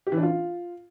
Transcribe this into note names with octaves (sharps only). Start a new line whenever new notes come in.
G4
E3
D4
F4